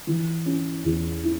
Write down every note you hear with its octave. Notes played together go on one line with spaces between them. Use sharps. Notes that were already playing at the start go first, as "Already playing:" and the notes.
E3
C#4
E2
E4